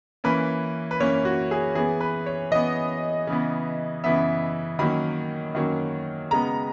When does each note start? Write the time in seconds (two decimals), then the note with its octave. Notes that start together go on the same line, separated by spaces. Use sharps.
0.24 E3 A#3 C#4 B4
0.91 B4
1.00 E3 A#3 C#4 C#5
1.25 F#4
1.51 G#4
1.75 E3 B3 G#4
2.01 B4
2.26 C#5
2.51 E3 B3 D#5
3.27 C#3 E3 B3
4.04 C#3 E3 B3 E5
4.79 D#3 F#3 A#3 C#4 B5
5.55 D#3 F#3 A#3 C#4
6.31 C#3 G#3 B3 A#5